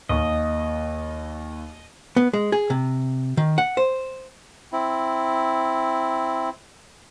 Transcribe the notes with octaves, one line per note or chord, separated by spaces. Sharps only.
D#2 A#3 D#5 C#6
B3
G#3
G#4
C3
D#3
F#5
C5
C4 E4